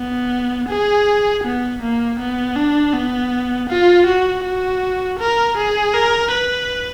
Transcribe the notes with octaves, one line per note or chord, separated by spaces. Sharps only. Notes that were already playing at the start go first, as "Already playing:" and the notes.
Already playing: B3
G#4
B3
A#3
B3
D4
B3
F4
F#4
F#4
A#4
G#4
A#4
B4